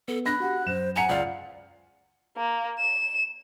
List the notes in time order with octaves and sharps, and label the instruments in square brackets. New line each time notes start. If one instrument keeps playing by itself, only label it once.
[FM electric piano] B3 [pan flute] A4
[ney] D4 [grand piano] B5 A#6 [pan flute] F#6
[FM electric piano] F#4 G4 [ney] F#5
[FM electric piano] F#2 [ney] C5 [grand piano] E7
[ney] F#5 [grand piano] G#5 C#7 [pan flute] A#5
[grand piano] C#2 F5 [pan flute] D5
[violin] A#3
E7